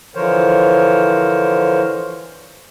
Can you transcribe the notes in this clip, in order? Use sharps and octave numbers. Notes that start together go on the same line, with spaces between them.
D3 E3 F3 A#4 C5 C#5